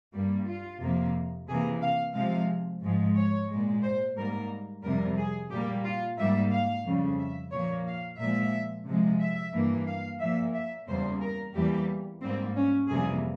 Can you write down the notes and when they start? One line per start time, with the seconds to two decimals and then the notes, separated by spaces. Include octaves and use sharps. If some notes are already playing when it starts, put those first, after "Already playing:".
0.14 G2 G3 A#3
0.47 F4
0.81 F2 C3 F3 A#3
1.48 C3 E3 A#3 G#4
1.82 F5
2.15 C3 F3 G#3 F5
2.82 G#2 F3 G#3
3.16 C#5
3.49 A#2 G#3
3.83 C5
4.17 G#2 G3 A#3 A#4
4.83 F2 C3 G3 A#4
5.17 G#4
5.51 A#2 G3 A#3 G4
5.85 F4
6.18 G#2 G3 A#3 E5
6.52 F5
6.85 F2 C#3 G3
7.19 E5
7.52 A#2 F3 A#3 C#5
7.86 F5
8.19 A#2 F3 G#3 E5
8.87 C3 F3 G#3
9.20 E5
9.54 G2 E3 A#3
9.87 F5
10.21 A#2 F3 A#3 E5
10.54 E5
10.88 E2 C#3 G3 A#3 C5
11.22 A#4
11.55 E2 E3 G3 A#3 G4
12.22 G#2 G3 A#3 C4
12.56 C#4
12.89 F2 C3 E3 G3 A#3 G#4